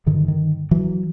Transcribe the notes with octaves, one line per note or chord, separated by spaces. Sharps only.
G2 D3 D#3
D#3
E3 F#3